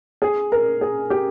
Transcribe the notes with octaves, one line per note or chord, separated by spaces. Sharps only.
G#4
A#4
G#4
G4